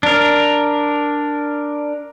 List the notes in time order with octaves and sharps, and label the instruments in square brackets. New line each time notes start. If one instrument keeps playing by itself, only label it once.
[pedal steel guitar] D4 A#4